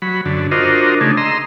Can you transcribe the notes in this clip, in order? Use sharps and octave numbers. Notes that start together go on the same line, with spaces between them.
F#3 B5
F#2 D3
D4 F4 F#4 A#4 C5 D#5
C#3 A3 D4 D#4 G#4
D#5 A#5 C6 E6